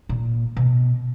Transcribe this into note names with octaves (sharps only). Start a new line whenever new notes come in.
A#2
B2